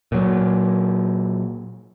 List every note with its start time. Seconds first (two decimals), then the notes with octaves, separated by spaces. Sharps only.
0.12 A#2 F#3